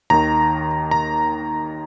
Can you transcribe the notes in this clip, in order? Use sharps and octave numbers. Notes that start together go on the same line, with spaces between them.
D#2 D#3 A#5
A#5